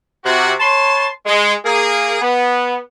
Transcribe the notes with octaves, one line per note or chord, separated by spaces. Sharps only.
C3 F#4
B4 C#5 A5 C6
G#3
A#3 G#4
B3